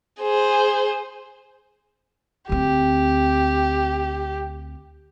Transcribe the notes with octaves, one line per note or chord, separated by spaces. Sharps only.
G#4 C5
D2 C4 G4